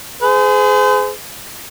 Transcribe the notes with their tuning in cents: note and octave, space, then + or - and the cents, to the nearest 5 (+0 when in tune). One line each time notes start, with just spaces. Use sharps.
G#4 +15 C5 -40